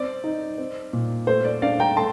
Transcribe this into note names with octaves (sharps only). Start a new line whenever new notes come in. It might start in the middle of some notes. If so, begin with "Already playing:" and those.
Already playing: C4 D5
D#4
C4
A#2
A3 C5
D5
D4 D5 F5
G5 A#5
A3 A5 C6